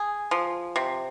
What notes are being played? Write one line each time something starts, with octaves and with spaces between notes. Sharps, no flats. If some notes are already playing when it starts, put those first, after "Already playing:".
Already playing: G#4
F3
C3